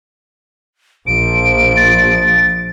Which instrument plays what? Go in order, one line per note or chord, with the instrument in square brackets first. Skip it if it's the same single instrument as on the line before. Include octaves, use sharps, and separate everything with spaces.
[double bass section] A#1 F3 [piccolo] D7
[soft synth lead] A6